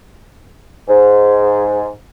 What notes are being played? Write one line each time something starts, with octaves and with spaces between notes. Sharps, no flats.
G#2